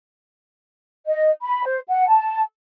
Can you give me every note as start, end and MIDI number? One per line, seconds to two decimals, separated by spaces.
1.08 1.30 75
1.42 1.64 83
1.65 1.79 72
1.88 2.07 78
2.07 2.42 81